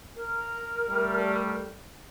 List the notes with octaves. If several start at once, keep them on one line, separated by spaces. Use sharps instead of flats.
A#4
G3 A3